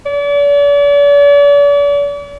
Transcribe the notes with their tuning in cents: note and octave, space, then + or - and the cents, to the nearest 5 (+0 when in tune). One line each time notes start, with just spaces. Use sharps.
D5 -45